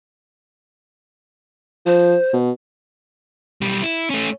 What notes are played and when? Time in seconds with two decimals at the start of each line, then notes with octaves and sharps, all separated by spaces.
1.86 F3 C5
2.33 B2
3.61 B1 G3
3.83 E4
4.10 A3 C#4